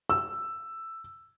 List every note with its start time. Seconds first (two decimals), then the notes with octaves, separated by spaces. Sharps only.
0.10 E6